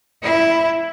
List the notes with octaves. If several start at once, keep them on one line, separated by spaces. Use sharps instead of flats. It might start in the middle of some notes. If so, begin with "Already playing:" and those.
E4